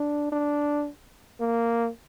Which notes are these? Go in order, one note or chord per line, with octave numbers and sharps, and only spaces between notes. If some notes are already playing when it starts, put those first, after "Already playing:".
Already playing: D4
D4
A#3